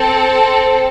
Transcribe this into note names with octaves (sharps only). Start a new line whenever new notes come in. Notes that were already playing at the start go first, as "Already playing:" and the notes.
Already playing: C4 A4